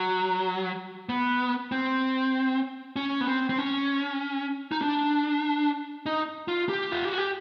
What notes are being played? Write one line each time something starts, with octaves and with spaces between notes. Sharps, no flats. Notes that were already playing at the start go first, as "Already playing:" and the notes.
Already playing: F#3
B3
C4
C#4
B3
C4
C4
C#4
D#4
D4
D#4
F4
G4
F4
F#4
G4